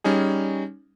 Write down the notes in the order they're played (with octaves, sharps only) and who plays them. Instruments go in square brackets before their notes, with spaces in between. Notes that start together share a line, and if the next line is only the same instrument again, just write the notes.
[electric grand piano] G3 C#4 D#4 G#4